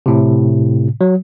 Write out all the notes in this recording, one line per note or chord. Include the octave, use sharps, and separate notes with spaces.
A2 C3
F#3